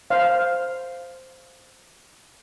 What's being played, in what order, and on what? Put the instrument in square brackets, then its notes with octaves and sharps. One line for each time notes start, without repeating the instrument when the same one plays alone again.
[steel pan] C5 F5